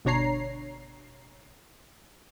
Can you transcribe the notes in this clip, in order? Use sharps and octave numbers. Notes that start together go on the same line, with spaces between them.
G1 B2 D4 C#5 A#5 C7